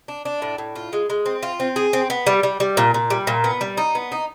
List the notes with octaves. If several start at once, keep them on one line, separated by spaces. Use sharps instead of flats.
D4
D4
A2
A2
F4
G#3
G#3
C4
F4
C4
G#4
C4
B3
G3
G3
G3
A#2
A#2
G3
A#2
B3
G3
D#4
B3
D#4